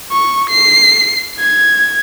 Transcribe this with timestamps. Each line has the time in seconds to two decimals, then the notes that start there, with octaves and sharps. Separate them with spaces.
0.12 C#6
0.50 C7
1.40 G#6